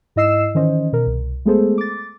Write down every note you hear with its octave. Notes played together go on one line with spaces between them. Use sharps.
G#2 E4 D#5 E6 C7 E7
D#3 E3 C#4 C5 D#5
B2 A#4
C2
G#3 A3 B3 G#4 A4 C5
D6 A6